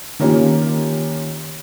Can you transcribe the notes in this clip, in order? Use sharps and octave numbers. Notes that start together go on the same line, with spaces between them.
D#3 A#3 C#4 F4 G4